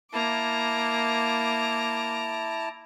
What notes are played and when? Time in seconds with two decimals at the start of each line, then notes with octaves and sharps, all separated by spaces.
0.13 A#3 E4 A5 A#5 D6